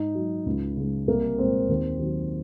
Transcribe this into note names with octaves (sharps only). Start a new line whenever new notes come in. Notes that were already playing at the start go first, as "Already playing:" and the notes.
Already playing: G#2 D#4
F#3
C#2
C#3 G#3
C2 A#3
A#2 G#3 C4
D#2
D#3 F#3